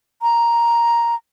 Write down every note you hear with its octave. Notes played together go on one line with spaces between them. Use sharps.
A#5